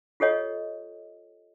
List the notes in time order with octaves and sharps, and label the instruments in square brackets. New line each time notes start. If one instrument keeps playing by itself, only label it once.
[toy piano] F4 G4 A4 C#5 D#5